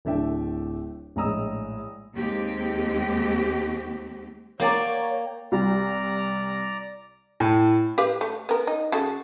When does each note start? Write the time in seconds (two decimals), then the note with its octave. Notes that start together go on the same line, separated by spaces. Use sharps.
0.05 D1 A3 D4 E5 G5
1.16 A#1 A2 G#3 A#5 D#6 E6
2.15 D#2 G#3 A#3 C4 G4
4.60 A#3 C#5 D5 G5 A#5
5.52 C2 D5 A#5
7.40 A2
7.98 G4 B4 F5
8.21 A3
8.49 B3 A#4
8.67 D#4
8.92 C#3 F#4 A4